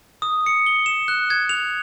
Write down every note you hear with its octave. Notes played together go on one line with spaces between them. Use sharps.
D#6
C#7
G7
E7
F#6
G#6
F7